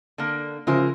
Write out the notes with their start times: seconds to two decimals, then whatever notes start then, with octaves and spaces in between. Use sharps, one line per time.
0.18 D3 A#3
0.67 C#3 F3 G#3 E4 A#4 C5